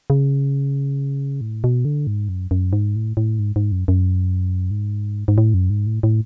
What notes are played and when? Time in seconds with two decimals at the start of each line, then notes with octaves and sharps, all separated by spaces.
0.10 C#3
1.41 A2
1.64 B2
1.85 D3
2.07 G#2
2.29 F#2
2.51 F#2
2.73 G#2
2.96 A2
3.17 A2
3.39 G#2
3.56 G#2
3.72 F#2
3.88 F#2
4.71 G#2
5.28 G#2
5.38 A2
5.54 F#2
5.70 G#2
5.87 A2
6.03 A2